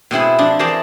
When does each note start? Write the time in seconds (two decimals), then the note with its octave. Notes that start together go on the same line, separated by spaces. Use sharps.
0.11 B2 C4 E4 G#4
0.38 F3 D4
0.59 E3 G#4 A#4 C5 D5 A5